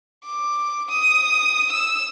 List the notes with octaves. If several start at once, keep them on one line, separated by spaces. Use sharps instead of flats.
D6
D#6
E6